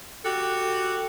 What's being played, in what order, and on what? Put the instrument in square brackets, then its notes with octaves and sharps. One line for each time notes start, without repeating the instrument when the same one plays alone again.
[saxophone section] F#4 G4 A4